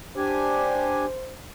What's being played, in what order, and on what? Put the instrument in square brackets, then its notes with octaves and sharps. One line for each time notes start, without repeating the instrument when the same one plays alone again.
[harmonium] D4 G4 G#5 [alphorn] C5